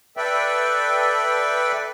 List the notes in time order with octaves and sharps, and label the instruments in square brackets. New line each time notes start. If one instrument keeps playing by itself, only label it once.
[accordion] A4 B4 D5 E5 G5